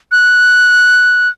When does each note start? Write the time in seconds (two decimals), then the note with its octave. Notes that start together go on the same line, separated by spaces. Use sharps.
0.12 F#6